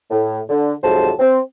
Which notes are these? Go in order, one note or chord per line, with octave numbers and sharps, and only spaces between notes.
A2
D3
F2 G#2 C3 F#3 C5 A5
C4